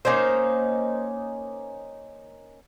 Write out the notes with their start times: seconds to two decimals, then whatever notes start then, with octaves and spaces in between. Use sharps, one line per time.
0.05 A#3 C#4 D#4 C5